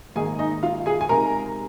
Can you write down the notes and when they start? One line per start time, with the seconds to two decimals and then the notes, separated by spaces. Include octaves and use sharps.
0.16 G#2 D#3 A#3 D#4 G#4 G#5
0.39 D#4 D#5
0.63 F4 F5
0.86 G#4 G#5
1.01 G#5
1.09 C3 G#3 D#4 A#4 A#5